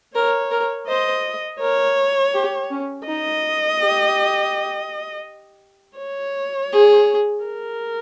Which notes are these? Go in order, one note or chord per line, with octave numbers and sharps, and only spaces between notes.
A#4 C#5
A#4
C5 D#5
A#4 C#5
G4
C#4
D#4 D#5
G4
C#5
G#4
A#4